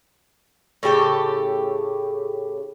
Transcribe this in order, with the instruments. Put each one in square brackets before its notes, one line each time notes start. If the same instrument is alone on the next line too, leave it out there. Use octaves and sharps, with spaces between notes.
[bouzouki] A2 C#3 G4 A4